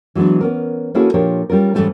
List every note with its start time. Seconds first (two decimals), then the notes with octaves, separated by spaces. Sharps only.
0.15 E3 F#3 G#3 B3 D4
0.41 B3 C#4 A#4
0.95 A3 A#3 C#4 E4 F#4 G#4
1.14 A#2 F3 D4 G4 A#4 C#5
1.50 G3 C#4 F4 A#4
1.74 G#2 E3 G3 A3 C#4 E4